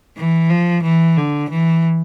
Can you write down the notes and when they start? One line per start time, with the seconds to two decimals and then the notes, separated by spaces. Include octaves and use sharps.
0.17 E3
0.50 F3
0.83 E3
1.17 D3
1.50 E3